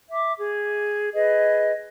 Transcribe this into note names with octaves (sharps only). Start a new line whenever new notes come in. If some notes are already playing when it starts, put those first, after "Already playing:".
E5 D6
G#4
G#4 B4 D#5